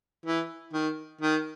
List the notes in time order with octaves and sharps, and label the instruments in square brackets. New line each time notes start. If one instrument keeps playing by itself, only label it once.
[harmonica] E3
D#3
D#3